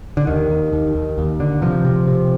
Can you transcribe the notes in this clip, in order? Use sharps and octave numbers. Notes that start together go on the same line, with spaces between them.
D3
D#2 D#3
D#2
D#2
D#2
D#2
D3
C3 F3
C3
C3